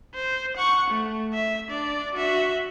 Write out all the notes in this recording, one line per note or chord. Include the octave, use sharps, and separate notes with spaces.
C5
F#5 C#6
A3
E5
D4 D5
F#4 E5